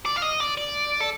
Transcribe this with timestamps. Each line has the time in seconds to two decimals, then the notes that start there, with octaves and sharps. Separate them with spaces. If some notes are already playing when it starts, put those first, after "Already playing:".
0.06 D5
0.16 F5
0.22 D#5
0.40 D5
0.57 D5
1.01 A4